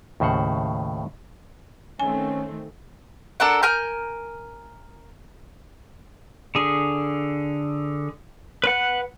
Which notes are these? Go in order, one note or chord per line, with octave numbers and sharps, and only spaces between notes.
D#2 A2 C#3 C5 F#5
D#3 A3 C4 C#4 G#5
D4 A4 A#4 F#5
A#4 G#5 F6 G6
D3 G#4
B4 F#5